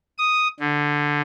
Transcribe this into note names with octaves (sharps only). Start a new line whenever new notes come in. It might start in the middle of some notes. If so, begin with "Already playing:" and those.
D#6
D3